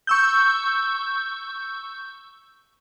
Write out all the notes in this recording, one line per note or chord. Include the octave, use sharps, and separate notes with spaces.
C#6 E6 G6